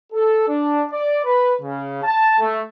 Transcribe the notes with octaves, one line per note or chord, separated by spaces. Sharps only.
A4
D4
D5
B4
C#3
A5
A3